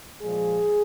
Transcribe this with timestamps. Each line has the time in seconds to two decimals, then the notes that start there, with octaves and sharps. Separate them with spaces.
0.20 A#2 F3 G#3 G#4